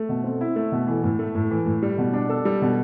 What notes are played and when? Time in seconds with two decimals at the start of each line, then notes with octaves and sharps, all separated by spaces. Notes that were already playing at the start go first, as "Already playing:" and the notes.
Already playing: A3
0.09 B2
0.24 C4
0.41 E4
0.56 A3
0.72 B2
0.87 E3
1.03 A2
1.19 A3
1.35 A2
1.51 E3
1.66 A2
1.82 G3
1.98 B2
2.13 D4
2.29 A4
2.45 G3
2.62 B2